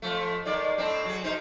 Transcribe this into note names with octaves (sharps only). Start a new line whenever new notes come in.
F2 F3 A3
D#3 G#3 D5
A2 C4 D4
F#3 G#4
B2 D#4 C5